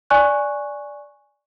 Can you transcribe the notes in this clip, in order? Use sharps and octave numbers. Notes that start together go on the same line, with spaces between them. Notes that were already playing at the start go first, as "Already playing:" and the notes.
D5 G#5 C#6 F#6